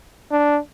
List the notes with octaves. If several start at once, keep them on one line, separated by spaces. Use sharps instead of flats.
D4